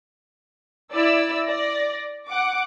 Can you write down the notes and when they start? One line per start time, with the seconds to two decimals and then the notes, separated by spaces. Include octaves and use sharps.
0.94 E4 D5 E6
1.46 D5 A#6
2.27 F#5 D6